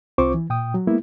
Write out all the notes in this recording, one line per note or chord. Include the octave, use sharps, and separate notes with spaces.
C2 C4 F4 C5 C#6 D6
E3
A#2 G5 D#6
F#3
G#3 A#3 B3 E4